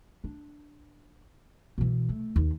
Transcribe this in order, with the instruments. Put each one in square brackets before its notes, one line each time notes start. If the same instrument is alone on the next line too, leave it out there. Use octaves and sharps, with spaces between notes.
[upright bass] D4
B2 E3
A3
D#2